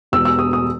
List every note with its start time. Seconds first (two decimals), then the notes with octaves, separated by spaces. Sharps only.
0.12 E1 E2 B2 E6
0.25 E6
0.39 D#6
0.53 D#6